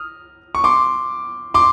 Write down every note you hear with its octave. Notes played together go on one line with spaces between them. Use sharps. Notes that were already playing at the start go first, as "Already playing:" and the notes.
Already playing: D#6 F6
C#6
C6 D6
C6 D6